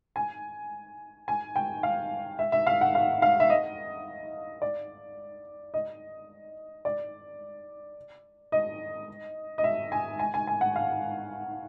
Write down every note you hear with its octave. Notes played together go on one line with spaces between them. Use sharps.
G#5
G#5
G5
F5
E5
E5
F5
F#5
F5
F5
E5
D#5
D5
D#5
D5
D#5
D#5
E5
G#5
G#5
G#5
G#5
F#5
F5